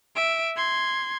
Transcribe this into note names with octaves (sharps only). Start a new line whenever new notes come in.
E5 D7
C6 G#6